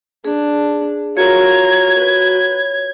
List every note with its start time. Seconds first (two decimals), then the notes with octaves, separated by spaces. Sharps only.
0.25 D4 G#4
1.17 F4 F#4 A#4 C#5 G#6
1.97 B4